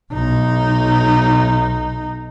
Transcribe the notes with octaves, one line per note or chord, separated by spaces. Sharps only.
B1 D#4